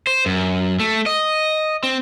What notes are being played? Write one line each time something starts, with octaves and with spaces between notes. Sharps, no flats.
C5
F#2
A3
D#5
C4